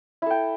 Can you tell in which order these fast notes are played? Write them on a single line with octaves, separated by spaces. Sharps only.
E4 A4 G5